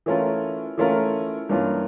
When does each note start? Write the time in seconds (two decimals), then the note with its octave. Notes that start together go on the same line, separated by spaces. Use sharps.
0.06 E3 A3 C#4 F4 A#4
0.78 E3 A3 C#4 F4 A#4
1.49 G2 E3 A#3 C#4 F4